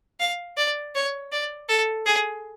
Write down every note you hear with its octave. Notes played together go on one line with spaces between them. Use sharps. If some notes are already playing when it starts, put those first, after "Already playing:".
F5
D5
C#5
D5
A4
G#4